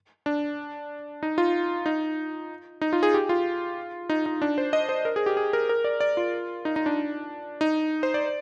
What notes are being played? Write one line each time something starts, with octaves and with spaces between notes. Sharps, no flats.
D4
D#4
F4
D#4
D#4
F4
G#4
G4
F4
D#4
D#4
D4
C5
D#5
C5
A#4
G#4
G4
G#4
A#4
A#4
D5
D5
F4
D#4
D#4
D4
D#4
C5
D5